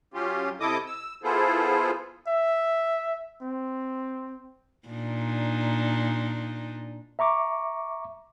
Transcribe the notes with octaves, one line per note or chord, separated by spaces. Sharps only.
F#3 C#4 F4 G4
C3 E4 A4 D#5 D6 D#6
E6
B3 E4 F4 G#4 A4 C5
E5
C4
A#2 D4 D#4
E5 A#5 C#6 D6